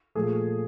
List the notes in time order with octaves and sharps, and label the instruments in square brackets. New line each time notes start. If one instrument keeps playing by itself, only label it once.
[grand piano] A#2 F3 A3 G#4